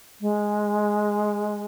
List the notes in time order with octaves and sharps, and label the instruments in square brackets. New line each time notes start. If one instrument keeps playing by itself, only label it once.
[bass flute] G#3